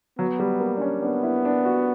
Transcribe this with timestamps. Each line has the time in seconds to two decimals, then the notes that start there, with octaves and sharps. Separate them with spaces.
0.18 F#3 B3
0.39 G3
0.60 A#3
0.77 D4
0.81 C#4
1.02 B3 D4
1.23 E4
1.45 D4
1.65 F#4